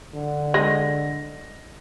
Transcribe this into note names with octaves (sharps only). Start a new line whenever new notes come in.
D3
G#3 A#6